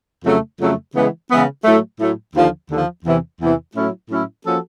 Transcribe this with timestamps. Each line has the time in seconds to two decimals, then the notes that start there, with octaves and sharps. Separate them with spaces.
0.25 F2 C#3 F#3 A3
0.60 F2 C#3 F#3 A3
0.94 C#3 E3 G#3 B3
1.30 C#3 E3 G#3 B3
1.64 A2 F#3 A3
1.99 A2 F#3 A3
2.35 D#2 D3 F3
2.70 D#2 D3 F3
3.05 E2 C3 E3
3.40 E2 C3 E3
3.75 A2 F#3 A3 C#4 E4
4.10 A2 F#3 A3 C#4 E4
4.45 F3 A#3 C#4 F#4 A4